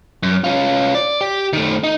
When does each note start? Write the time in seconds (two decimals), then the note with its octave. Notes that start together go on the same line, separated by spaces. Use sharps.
0.23 F#2
0.44 C#4 F4
0.95 D5
1.21 G4
1.53 D#3 A3
1.84 D#4